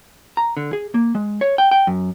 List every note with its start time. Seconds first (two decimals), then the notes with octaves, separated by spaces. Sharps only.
0.37 A#5
0.57 D3
0.73 G#4
0.94 A#3
1.15 G#3
1.41 C#5
1.58 G5
1.71 G5
1.87 F#2